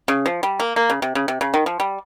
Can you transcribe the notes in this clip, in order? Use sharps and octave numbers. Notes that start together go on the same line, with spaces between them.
C#3
F3
G3
A#3
A#3
C#3
C3
C#3
C3
C#3
D#3
F3
G3